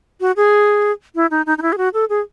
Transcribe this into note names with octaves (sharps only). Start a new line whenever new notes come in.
F#4
G#4
E4
D#4
D#4
D#4
E4
G#4
F#4
A4
G#4